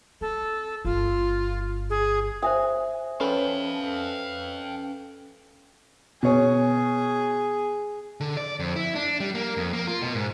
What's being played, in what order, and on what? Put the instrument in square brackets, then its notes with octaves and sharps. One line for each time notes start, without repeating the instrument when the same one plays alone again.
[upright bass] C4 [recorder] A4
[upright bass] G1 G2 [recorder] F4
[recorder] G#4
[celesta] C5 E5 D#6 [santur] G#5
[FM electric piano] C#4 A4 B4 [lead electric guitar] F5 G5
[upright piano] B2 C#5 [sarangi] G#4
[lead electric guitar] D3
D5
F2
E4
D4
G3
A#3
F2
A#3
F4
B2
G#2